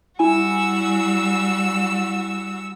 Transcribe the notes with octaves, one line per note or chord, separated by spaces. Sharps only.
G3 E4 F#4 G#5 E6